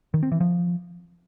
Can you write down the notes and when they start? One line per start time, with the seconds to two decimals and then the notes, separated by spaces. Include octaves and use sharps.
0.14 D#3
0.23 C4
0.32 E3
0.40 F3